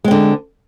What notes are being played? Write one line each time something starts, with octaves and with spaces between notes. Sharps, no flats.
D3 G#3 C4